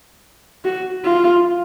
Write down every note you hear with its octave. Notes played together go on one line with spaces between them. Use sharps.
F#4
F4